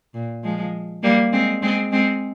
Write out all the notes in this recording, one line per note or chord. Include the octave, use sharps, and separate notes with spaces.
A#2
F3 G#3
G3 A#3
G#3 C4
G#3 C4
G#3 C4